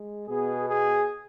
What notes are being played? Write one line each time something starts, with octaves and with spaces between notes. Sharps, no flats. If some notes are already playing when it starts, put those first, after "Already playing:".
Already playing: G#3
B2 B3 G#4
G#4